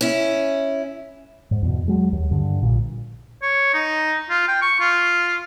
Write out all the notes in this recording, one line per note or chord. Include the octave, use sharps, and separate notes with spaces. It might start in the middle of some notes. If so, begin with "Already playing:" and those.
C#4 E4
G#2
E2 B2
F#3 G#3
D#2
G2 D3
A#1 A#2
C#5
D#4
F4
G5
C#6
F4